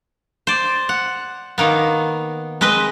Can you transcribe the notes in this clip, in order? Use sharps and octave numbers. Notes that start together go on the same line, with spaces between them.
C5 D5
F#5
D#3 A#3 B3
G#3 C4 B4 D#5